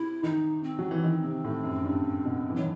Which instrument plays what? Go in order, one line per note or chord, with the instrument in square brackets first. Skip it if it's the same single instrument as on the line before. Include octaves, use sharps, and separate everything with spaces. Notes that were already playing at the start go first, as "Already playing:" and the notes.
Already playing: [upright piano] C3 [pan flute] E4
[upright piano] D#3 [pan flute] D#4
[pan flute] C4
[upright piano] F#3
E3
D#3
C3
A2
F#2
G2
B2
E3
[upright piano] D#3 [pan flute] F#3